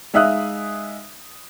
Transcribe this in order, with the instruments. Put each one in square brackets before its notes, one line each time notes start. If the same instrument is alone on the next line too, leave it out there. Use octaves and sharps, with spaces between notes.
[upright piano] G#3 D#4 E5 F5 D#6 F#6